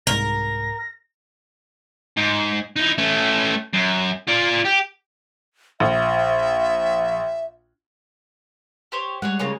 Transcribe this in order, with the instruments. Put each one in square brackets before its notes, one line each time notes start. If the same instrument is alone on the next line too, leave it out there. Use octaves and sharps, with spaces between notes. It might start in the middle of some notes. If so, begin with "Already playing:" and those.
[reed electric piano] C2 G#2 [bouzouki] A#4 [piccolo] A#6
[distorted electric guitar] G#2
D#4 E4
A3 C#4
F#2
F4 D5
G4
[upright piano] A#1 [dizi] E5
[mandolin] G4 C5 C#5
[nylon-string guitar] G3 G#3 [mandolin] G#4 C#5 F#5
[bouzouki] C#3 A#3 [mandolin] F4 C#5